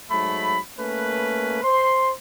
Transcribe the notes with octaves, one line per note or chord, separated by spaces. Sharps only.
G#2 F#3 A3 B5
A3 A#3 C#4 B4
C5 C6